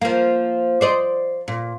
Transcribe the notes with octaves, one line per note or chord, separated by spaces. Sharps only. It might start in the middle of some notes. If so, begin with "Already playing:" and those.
F3 A#3
C5 D5 D#5
A#2